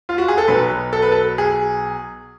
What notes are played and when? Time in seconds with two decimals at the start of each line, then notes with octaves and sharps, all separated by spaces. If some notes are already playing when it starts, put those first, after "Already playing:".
0.09 F4
0.18 F#4
0.28 G#4
0.38 A4
0.48 B1 B2 F#3 B4
0.93 A4
1.02 B4
1.12 A4
1.38 G#4